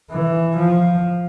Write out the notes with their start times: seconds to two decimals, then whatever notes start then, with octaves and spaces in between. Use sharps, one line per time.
0.11 E3
0.58 F3